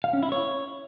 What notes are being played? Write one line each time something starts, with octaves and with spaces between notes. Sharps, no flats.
F5
C#4
E4
C#5